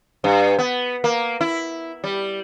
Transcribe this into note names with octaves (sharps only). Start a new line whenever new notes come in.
G2
B3
A#3
E4
G3